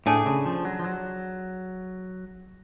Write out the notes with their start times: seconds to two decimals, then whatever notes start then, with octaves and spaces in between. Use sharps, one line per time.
0.06 A2 A3 D4 G#4
0.26 C#3
0.46 F3
0.65 F#3
0.79 F3
0.84 F#3